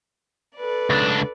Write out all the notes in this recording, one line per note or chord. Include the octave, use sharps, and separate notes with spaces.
A4 B4 D5
C#2 D4